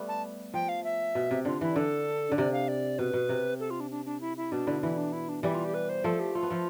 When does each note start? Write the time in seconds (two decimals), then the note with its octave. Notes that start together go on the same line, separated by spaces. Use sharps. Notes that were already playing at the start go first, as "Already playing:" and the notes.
Already playing: G3 A3 B3
0.08 A5
0.54 F3 G5
0.69 F5
0.84 E5
1.15 B2
1.31 C3
1.45 D3 F4
1.61 E3 E4
1.76 D3 A4
2.32 D3
2.37 C3 D5
2.53 F5
2.68 D5
2.99 B2 B4
3.13 B2
3.29 C3
3.60 A4
3.70 F4
3.80 D4
3.91 D4
4.05 D4
4.21 E4
4.37 E4
4.52 B2 D4
4.67 D3 E4
4.82 E3 E4
4.97 D4
5.13 E4
5.29 D4
5.43 E3 G3 E4
5.54 F4
5.65 G4
5.74 B4
5.89 C5
6.04 F3 A3 A4
6.20 G4
6.35 A3 F4
6.43 B3
6.50 F3 A3